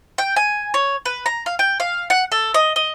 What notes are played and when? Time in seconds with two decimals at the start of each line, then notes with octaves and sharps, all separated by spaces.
0.18 G5
0.36 G#5
0.74 C#5
1.05 B4
1.26 A#5
1.46 F5
1.59 G5
1.80 F5
2.10 F#5
2.32 A4
2.54 D#5
2.76 D#5